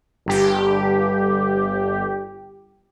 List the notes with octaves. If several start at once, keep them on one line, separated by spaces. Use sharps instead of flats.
G1 G2 G4